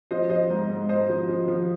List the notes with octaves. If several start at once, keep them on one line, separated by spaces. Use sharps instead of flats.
F3 C5 D#5
F3 C5 D#5
G#2
G#2
G#2 C5 D#5
F3
F3
F3